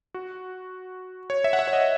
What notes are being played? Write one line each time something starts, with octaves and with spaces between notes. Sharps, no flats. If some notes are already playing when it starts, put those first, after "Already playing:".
F#4
C#5
E5
F#5
E5
C#5
D#5